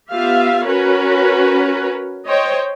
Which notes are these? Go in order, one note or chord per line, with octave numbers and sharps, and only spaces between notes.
B3 F4 G4 E5 F5
C#4 F#4 A#4 B4 C#5
C5 C#5 D#5 G5